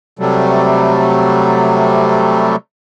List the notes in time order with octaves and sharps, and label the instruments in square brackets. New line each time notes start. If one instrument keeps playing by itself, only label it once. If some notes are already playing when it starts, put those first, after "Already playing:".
[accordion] C3 F#3 G3 A3